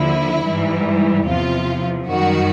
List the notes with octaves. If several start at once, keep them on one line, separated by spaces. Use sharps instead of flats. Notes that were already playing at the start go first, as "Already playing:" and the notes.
Already playing: D#2 D3 F3 E4
G#2 E3 G3
E2 C3 F3 F4
F#2 D#3 G3 F#4